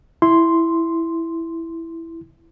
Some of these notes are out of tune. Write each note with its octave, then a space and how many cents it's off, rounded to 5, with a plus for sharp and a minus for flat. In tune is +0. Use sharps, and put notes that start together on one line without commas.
E4 +0 C6 +0